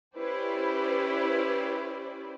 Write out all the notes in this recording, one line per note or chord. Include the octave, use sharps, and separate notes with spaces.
C#4 E4 G4 B4 C5 D5